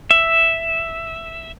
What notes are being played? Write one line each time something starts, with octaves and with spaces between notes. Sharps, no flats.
E5